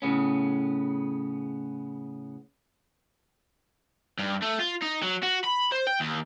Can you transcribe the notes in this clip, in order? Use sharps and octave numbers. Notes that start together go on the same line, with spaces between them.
A2 C#3 B3 C#4
G2
A3
F4
D#4
F#3
F#4
B5
C5
G5
D#2